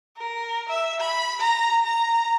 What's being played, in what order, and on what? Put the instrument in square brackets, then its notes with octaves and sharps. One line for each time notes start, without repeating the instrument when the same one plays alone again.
[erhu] A#4
E5
B5
A#5
A#5